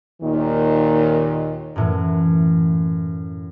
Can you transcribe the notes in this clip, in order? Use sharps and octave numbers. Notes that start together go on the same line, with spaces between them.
D#2 A#2 D#3
F#2 A2 E3